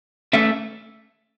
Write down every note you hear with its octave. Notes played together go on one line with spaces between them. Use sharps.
A3 C#4 A4 E5